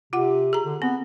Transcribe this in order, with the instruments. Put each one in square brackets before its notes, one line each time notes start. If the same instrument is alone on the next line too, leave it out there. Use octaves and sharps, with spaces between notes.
[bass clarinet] C3 [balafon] F4 F#5
[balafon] G#4 A#5
[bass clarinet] D3
[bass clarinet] B3 [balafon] C4